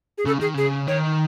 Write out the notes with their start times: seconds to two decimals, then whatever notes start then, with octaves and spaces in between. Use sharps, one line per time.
0.18 G#4
0.26 C#3 A4
0.40 D#3 G#4
0.54 C#3 G#4
0.87 D#3 C#5